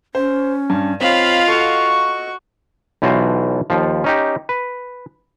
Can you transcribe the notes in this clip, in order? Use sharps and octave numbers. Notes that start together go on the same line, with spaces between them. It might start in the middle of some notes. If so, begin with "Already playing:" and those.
C#4 C5
G2
C4 F4 C#5 D#5 F5 B5
F#4 A4 C#6
B1 E3 F4 F#4 C5
D#2 F3
C#4 D#4 G4
B4